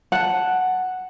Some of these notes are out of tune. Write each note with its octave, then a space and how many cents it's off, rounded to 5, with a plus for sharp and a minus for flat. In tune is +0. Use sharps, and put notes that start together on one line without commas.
F#5 +0 A5 +0